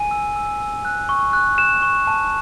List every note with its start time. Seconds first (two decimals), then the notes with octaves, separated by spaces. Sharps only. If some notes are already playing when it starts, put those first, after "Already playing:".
Already playing: G#5 D#7
0.11 E6
0.36 E6
0.61 E6
0.85 F#6
1.09 C#6
1.33 F#6
1.58 F#6 E7
1.82 C#6
2.07 A5